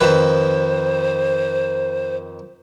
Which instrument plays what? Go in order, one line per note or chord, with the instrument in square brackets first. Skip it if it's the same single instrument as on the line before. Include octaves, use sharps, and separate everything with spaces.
[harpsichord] F2 D#3 B4 [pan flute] C5